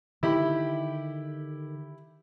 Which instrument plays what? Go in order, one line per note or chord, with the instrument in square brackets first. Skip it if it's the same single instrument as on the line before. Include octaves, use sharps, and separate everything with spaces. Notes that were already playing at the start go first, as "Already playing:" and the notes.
[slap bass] D3 D#3 [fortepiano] E4 G4 B5